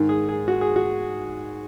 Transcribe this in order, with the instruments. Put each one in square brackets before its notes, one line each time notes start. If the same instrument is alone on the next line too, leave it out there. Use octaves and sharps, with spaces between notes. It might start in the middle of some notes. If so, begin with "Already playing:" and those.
Already playing: [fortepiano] G#2 D#3
G#4
G#4
F#4
G#4
F#4